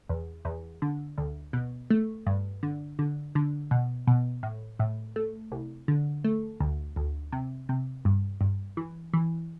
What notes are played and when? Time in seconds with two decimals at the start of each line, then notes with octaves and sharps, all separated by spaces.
0.09 E2
0.45 E2
0.82 D3
1.18 D2
1.53 B2
1.90 A3
2.26 G2
2.63 D3
2.99 D3
3.35 D3
3.71 B2
4.07 B2
4.43 A2
4.79 A2
5.16 A3
5.52 C2
5.88 D3
6.24 A3
6.60 D2
6.96 D2
7.32 C3
7.69 C3
8.05 G2
8.41 G2
8.77 E3
9.13 E3